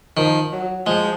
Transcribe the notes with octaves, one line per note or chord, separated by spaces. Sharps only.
D#3 F3
F#3
F3 G#3